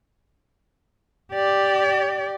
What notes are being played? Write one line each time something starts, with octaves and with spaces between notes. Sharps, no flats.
G4 D5